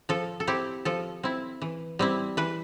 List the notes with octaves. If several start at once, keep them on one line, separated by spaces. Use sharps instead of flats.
F3 A4
A4
C4 E4 G4
F3 A4
C4 E4
E3
G3 C4 E4
E3 B4